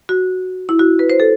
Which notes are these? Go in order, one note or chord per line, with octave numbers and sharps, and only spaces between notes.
F#4
E4
F#4
B4
C5
A4